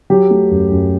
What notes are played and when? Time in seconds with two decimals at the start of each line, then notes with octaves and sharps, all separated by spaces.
0.10 F#3 G4
0.31 A3
0.51 F#2
0.72 F#2